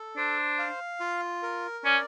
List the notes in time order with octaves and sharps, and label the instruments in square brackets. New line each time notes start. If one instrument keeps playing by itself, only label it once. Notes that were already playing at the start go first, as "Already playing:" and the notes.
Already playing: [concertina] A4
[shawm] D4 [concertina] C5
[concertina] F5
F4
A#4
[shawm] C#4 [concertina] D5